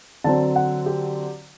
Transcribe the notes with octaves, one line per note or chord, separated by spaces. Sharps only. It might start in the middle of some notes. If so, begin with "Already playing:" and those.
D3 F#3 C4 A5
F#5
G4